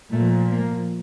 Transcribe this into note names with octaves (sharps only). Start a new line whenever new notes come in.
A#2 F3 A3
A#3